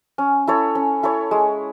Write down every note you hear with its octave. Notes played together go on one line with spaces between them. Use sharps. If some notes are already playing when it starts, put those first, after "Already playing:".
C#4
E4 A4 C#5
C#4
E4 A4 C#5
G#3